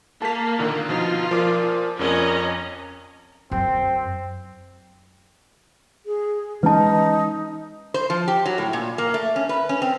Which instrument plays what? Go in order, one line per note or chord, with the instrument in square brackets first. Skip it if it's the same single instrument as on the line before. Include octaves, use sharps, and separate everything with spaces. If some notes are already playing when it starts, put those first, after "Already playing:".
[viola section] A#3 [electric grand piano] A5 B6
[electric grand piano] A#2 D3 D#3
[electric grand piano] B2 F3 D#4 [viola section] F4
[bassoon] A#2 [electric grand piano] F3 D6
[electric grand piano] F2 [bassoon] A#2 [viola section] C#4 D#5 A#5
[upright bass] F#2 [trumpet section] C4
[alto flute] G#4
[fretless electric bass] E3 G#3 C#4 [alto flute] D#4 [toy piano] B4 A5
[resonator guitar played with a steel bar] C5
F3
G4
F#3
A2
A#2
A#3
A3
C#4
B4
C#4
C4